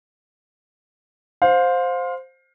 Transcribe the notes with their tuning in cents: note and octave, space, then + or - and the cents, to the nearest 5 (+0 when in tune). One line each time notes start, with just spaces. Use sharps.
C5 +0 F5 +25